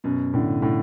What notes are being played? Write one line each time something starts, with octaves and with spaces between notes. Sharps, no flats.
F#2 B2
A2 D3
A2 D3